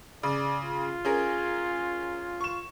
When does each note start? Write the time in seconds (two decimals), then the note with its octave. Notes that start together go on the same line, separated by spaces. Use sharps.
0.23 C#3 D5
0.64 F4
1.05 C#4 G#4 A#4
2.41 C#6 E7